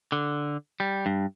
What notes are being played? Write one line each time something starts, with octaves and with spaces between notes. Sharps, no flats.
D3
G3
G2